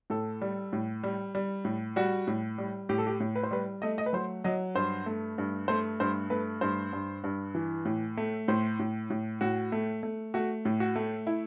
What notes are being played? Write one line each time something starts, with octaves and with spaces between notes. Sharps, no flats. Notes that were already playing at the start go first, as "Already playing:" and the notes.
A2 A4
G3
A2
G3
G3
A2
G3 F#4
A2
G3
A2 G4
A4
G4
A2
B4
C5
G3 B4
A3 D#5
D#5
B4
F#3 C5
F#3 D#5
G2 C5
A3
G2
A3 C5
G2 C5
A3 B4
G2 C5
G2
G2
E3
A2
A3
A2 C5
A2
A2
A2 F#4
A3
A3
A3 F#4
A2
F#4
A3
E4